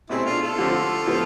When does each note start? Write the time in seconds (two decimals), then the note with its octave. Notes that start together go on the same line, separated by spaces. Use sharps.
0.09 B2 A3 C4 E4 G#4
0.25 D4 F4
0.42 F4 A4
0.58 D3 F3 A3 C4
1.06 A2 F3 B3